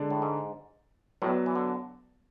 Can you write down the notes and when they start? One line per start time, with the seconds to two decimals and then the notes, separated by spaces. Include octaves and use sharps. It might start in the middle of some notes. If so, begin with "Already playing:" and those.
Already playing: D3 G#3 D4 A4 D5
0.10 A2
0.22 G#2
1.22 A2 F#3 B3 F#4 B4 D5
1.46 E3
1.55 D3